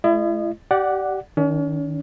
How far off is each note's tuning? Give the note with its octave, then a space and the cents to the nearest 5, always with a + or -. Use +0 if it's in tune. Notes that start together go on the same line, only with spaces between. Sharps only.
A3 -45 E4 +35 D#5 -30
G4 -25 D5 +0 F#5 +0
D#3 +0 C#4 +40